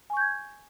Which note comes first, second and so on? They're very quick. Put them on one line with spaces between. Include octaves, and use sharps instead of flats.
G#5 C#6 G6 G#6